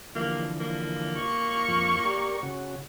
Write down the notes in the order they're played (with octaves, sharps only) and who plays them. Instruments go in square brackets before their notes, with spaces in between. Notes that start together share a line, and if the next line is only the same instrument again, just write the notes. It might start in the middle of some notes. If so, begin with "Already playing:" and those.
[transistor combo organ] D3 E3 F3 [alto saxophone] A#3
[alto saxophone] A#3
[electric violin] C#6
[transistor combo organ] F2 F3
G4 A#4 D5
C#3 F#4